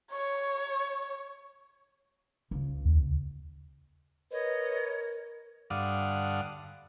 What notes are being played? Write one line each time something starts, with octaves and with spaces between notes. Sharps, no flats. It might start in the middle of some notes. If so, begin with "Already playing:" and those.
C#5 C#6
C#2
D#2
A#4 B4 C#5 D#5
G2 D3 F5 F#5 D6 D#6